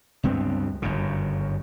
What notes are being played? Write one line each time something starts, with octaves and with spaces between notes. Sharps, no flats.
C#2 G2 B3 C4
G1 F#2 C#3